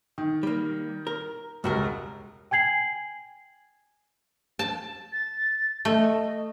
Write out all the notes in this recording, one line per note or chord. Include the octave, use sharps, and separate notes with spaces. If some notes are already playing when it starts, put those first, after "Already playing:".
D#3
G3 A#3
A#4
E1 C#2 G2 F#4 A#4
G5 G#5 G#6 C7 F#7
A5
A6
A3 D#5